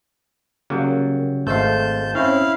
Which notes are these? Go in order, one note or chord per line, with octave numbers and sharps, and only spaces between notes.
C#3 F#3 G3 A#3
G#1 A3 C5 D#5 F5 A5 G6
C4 C#4 E4 F5